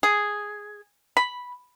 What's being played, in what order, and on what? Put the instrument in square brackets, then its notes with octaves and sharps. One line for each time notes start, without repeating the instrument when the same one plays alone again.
[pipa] G#4
B5